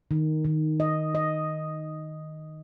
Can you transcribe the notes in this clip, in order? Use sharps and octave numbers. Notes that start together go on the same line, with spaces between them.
D#3
D#3
D#5
D#5